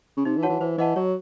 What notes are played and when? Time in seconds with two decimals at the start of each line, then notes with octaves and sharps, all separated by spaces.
0.17 C#3
0.25 C3 D#4
0.37 E3
0.43 F#4 C#5 F#5 A5
0.49 E3
0.60 E3 C5
0.78 E3 D#5 F#5 A5
0.96 F#3 C#5